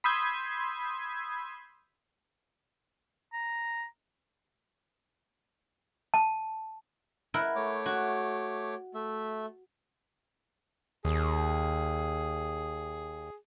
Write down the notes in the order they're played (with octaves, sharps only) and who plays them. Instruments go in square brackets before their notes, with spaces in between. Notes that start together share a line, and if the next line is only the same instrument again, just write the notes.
[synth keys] B5 C6 D#6 E6 G6 G#6
[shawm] A#5
[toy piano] A5
[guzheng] E4 A#4 F#5
[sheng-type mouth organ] A3 C#5 D6
[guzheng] F#4
[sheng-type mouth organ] A3 E5
[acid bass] D#2 [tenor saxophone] G#4